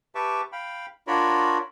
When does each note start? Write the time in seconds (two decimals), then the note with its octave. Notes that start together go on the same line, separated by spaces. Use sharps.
0.15 G4 B4 E5 A5 C#6 D6
0.52 F5 G5 B5
1.07 D4 F4 F#4 A#4 C#5 B5